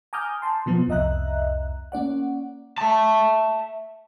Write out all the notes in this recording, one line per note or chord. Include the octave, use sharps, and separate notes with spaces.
G#5 A#5 D6 D#6 F6 G6
A5 C6
B2 F3 B3
C2 F2 D#5 E5 A#5 F#6
A#3 C#4 D5 F#5
E5 A5